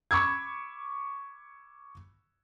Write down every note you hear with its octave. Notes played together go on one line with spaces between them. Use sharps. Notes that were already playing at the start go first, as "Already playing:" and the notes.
B5 C#6 D6 E6 G#6